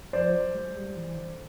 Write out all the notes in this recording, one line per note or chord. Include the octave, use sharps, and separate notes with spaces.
F3 C5 D5
F#3
G#3
G3
E3
D3